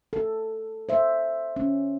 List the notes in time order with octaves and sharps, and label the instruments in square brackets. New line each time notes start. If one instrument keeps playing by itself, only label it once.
[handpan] A4
C5 E5
C#4